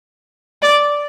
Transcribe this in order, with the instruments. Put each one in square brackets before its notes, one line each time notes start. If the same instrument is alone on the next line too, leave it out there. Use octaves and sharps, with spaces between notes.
[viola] D5